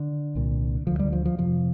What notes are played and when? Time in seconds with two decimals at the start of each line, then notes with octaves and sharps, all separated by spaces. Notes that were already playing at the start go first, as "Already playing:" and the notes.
Already playing: D3
0.35 C2 A#2
0.87 D2 D3 F3
0.99 G3
1.13 F3
1.26 F3
1.38 F2 C3 F3